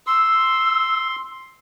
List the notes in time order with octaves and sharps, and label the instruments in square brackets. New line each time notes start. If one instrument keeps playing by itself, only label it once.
[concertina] C6 [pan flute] E6